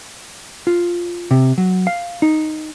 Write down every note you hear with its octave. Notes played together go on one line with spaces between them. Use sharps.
F4
C3
F#3
F5
D#4